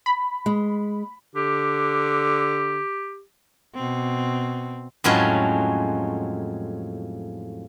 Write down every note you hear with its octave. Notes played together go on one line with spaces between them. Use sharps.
B5
G#3
D3 G4
B2 C4
F2 A2 F3 F#3 G#3 C#4